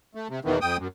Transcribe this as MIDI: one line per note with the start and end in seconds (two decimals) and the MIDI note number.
0.15 0.28 57
0.30 0.40 48
0.45 0.59 40
0.45 0.59 47
0.45 0.59 51
0.45 0.59 52
0.61 0.77 41
0.61 0.77 79
0.61 0.77 87
0.79 0.88 42